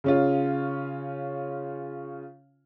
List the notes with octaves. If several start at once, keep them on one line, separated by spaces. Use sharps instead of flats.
C#3 C#4 F4